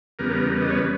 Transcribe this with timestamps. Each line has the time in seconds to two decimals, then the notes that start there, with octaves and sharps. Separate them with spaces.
0.19 E2 C#3 G3 B3 A#4
0.62 D#5
0.70 C#5
0.77 B4